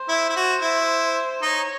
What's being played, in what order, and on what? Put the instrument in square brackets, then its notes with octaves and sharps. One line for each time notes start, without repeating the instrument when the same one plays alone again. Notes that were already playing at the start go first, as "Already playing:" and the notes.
Already playing: [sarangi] C5
[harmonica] E4
E4
F#4
E4
[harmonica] D#4 [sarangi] C#5